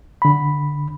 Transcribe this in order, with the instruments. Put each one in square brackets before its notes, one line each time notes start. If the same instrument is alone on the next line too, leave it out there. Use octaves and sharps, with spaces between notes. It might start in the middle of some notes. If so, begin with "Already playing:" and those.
[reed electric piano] D3 B5